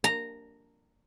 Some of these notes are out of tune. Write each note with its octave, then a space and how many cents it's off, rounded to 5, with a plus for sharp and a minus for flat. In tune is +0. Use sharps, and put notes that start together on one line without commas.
A#5 -10